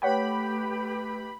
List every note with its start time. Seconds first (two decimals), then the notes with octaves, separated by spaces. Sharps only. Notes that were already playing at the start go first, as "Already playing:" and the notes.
0.02 A3 G4 B4 C#5 F#5 G5 B5